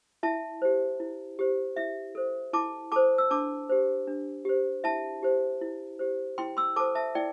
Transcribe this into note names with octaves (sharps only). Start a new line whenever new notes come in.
E4 E5 A5
G4 C5
E4
G4 C5
E4 E5
A4 C5
E4 A5 D6
A4 C5 A5 D6
E6
D4 A5 D6
G4 C5
D4
G4 C5
E4 E5 A5
G4 C5
E4
G4 C5
E4 G5 C6
C6 E6
A4 C5 A5 D6
E5 A5
E4 D5 G5